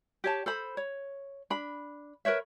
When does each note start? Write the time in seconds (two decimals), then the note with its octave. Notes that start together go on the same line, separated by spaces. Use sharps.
0.24 G4 C#5 A5
0.46 A4 C5 B5
0.77 C#5
1.50 D4 B5
2.25 A#4 B4 C#5 E5